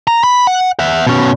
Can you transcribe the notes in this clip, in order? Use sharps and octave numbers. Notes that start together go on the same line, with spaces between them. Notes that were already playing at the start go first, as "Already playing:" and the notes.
A#5
B5
F#5
E5 F#5
B2 C#4